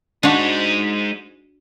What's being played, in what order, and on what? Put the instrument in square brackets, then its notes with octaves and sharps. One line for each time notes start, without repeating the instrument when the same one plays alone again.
[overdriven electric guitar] G#3 D#4 [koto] D4 F#4